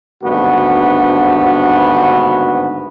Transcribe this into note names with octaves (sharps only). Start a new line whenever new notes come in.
G#1 D2 G2 B3 F#4